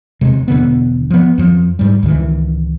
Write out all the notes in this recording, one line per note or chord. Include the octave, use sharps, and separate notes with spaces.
E1 C3 G#3
E1 D3 B3
F3 B3
F2 F3
G#2 G3
C#2 A2 D#3 E3